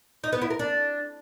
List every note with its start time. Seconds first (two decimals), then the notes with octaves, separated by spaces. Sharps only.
0.24 D#4
0.33 B3
0.41 E4
0.50 A#4
0.59 D4